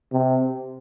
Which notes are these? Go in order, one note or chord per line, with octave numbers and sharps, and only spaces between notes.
C3